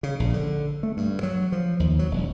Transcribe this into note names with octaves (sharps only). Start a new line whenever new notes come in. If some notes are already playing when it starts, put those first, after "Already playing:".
C#3
A#1
D3
A3
G2
F#3
F3
D#2
F#3
E1